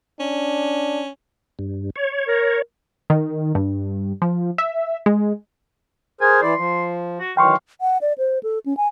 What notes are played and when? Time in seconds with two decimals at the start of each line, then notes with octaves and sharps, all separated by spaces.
0.20 C#4 D4
1.59 G2
1.96 C#5
2.27 A#4
3.10 D#3
3.55 G2
4.22 F3
4.58 E5
5.06 G#3
6.21 G#4 A#4 C5 G#5
6.42 E3 E4 D5 C6
6.57 F3
7.20 F#4
7.37 D#3 E3 F#3 F5 G5 C6 C#6
7.81 F#5
8.01 D5
8.18 C5
8.43 A4
8.66 C#4
8.77 G#5